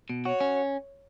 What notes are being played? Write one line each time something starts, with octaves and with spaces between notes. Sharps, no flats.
B2
F#4 C#5
C#4